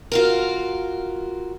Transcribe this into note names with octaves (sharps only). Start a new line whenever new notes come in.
F4 F#4 A#4